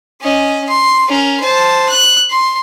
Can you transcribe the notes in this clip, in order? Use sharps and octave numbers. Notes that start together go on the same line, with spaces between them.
C#4 D#5
C6
C#4 A#4
C5 A5
F#6
C6